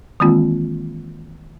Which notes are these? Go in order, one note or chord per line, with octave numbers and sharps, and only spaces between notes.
D#3 E3 G#3 A#3 C4 F4